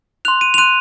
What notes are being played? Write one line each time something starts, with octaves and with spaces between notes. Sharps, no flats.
C6 F#6 F7
D#7
F7
C6 F#6 D#7